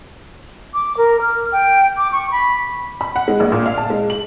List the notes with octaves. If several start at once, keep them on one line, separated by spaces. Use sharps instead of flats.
D6
A#4
F6
G5
D6
C#6
B5
B5
F#5
G#3
A#1
A#2
F5
A5
G#3
F#7